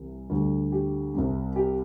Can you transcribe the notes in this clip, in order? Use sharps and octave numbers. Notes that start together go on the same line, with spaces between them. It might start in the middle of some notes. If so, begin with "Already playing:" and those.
Already playing: C2 C3 E3
D2 D3 G3
G4
C2 C3 G3
G4